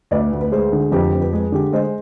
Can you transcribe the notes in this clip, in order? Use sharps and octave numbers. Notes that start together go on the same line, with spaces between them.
D2 B4 D5
D2
B4
G#3 G#4 C5
D3
F2 G4 B4
F2
B4
G#3 G#4
D3 G4
G#3 C5 D#5